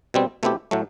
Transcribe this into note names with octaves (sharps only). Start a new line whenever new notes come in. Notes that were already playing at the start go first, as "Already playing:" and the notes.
B2 G3 C4
B2 A3 C4 E4 G4
A2 F#3 A3